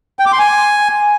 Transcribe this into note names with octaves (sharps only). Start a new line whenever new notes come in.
G5
D6
C6
G#5